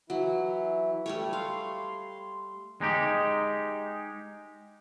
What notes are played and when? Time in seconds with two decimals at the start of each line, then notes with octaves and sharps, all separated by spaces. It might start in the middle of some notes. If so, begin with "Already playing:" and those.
0.10 E3 F#3 E4
1.06 G3 A3 C#5
1.33 F5 C6
2.81 G#3 D#4 G4